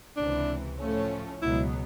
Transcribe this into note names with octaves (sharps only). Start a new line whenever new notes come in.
C#2 C3 E3 D4
A2 F3 A3 C#4
C#2 B2 F#3 B3 E4